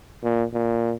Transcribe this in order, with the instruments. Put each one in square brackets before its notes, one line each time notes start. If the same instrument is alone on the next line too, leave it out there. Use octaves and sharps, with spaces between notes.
[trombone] A#2
A#2